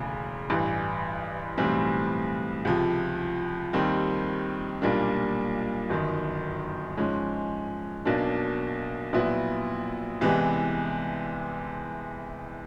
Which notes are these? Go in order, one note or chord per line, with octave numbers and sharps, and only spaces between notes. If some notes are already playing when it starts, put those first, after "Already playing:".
Already playing: E1 D2 C#3
A1 G2 E3
B1 A2 E3 G3 C4
C#2 C3 F3
D#2 D#3 G3 C4
B1 A#2 G3 A#3 D4
G1 F#2 D#3
G#2 F3 G#3 C#4
B1 B2 F#3 A#3 D4
A#1 A#2 F#3 B3 E4
C2 C3 E3 G#3 B3